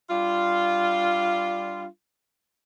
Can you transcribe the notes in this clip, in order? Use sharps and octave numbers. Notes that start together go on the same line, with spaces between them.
G3 D4 F4